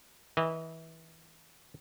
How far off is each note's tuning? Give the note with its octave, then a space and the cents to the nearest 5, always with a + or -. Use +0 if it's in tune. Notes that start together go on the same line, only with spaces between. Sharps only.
E3 -25 D#5 -15